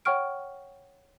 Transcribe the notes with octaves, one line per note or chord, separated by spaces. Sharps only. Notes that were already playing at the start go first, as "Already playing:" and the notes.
C#5 F#5 G5 C#6 F6 D7